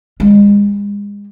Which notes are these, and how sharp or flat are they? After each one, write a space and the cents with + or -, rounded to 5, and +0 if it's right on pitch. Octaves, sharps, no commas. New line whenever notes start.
G#3 -35